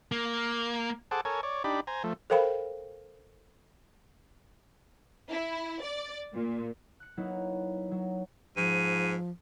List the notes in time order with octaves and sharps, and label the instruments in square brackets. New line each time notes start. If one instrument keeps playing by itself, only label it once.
[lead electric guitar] A#3
[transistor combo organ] G#4 A4 C5 F#5 A5 D6
A4 A#4 C#5 G#5
C#5 D5
D4 D#4 G4 D5 B5
C5 G#5 A#5
F3 A3
[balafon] A4 A#4 C5 F5 G5 B5
[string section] E4
D5
A#2
[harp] F#6 C#7
F#3 A#3 B3 D#4 E4
F#3
[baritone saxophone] G#2 [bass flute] F3 [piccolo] D#7